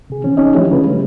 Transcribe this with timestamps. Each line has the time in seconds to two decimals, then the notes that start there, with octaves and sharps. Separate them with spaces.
0.10 C3 G#4
0.24 E3 C4 C#4
0.37 C#4 D#4 C#5 D#5
0.54 E3 F3 A3 D4 E4 G4
0.70 C#3 E3 C#4 F4 G#4 B4
0.86 G3 A3